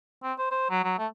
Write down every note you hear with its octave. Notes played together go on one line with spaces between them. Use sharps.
C4
C5
C5
F#3
F#3
A3